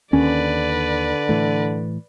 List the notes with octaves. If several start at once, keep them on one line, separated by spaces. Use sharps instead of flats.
D#2 D3 C#4 B4 D5
A2 E3 A3